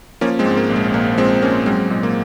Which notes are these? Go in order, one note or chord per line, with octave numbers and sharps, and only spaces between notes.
F3 A#3 C#4
G#3 C4
G#2
A#3
A#1
G#3
A#1 A#3
F3 G#3 C4
G#2 A#3 C#4
F#3 G#3 C4
A#2 G#3
A#3